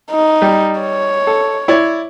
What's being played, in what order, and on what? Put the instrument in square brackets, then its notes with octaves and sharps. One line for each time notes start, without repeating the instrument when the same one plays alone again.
[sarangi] D#4
[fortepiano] G3
[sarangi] C#5
[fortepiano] A4
E4 C#5 D5